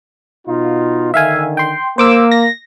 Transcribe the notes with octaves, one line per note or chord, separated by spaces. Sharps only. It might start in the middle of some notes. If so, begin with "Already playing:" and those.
B2 D#4 F4
D3 D#3 E5 F5 G#5
G5 C6
A#3 C5 D6 E6
A#6